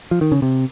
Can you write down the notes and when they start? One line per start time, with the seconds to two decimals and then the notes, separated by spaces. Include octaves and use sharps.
0.11 F3
0.21 D#3
0.32 C#3
0.42 C3